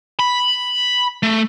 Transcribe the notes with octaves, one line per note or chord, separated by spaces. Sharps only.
B5
A3